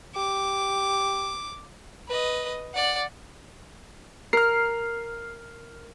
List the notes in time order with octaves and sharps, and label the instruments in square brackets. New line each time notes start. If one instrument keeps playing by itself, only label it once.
[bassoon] G4 [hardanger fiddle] D6
[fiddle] B4 D#5
D5 F#5
[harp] A#4 [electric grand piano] F6 C7